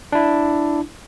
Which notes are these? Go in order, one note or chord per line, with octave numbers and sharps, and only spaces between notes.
D4 E4